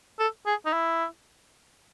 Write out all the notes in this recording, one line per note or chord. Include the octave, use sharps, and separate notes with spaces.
A4
G#4
D#4
E4